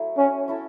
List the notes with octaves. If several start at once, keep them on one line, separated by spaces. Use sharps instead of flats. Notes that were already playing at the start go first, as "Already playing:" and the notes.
Already playing: F#3 A3 E4
C#4
C#4 E4 A4